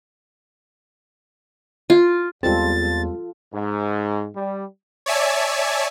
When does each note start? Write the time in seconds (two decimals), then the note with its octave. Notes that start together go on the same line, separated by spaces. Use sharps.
1.90 F4
2.43 E2 G3 G#3 C4 F4 A4 A6
3.54 G#2
4.36 G3
5.06 C#5 D5 E5 G#5 A5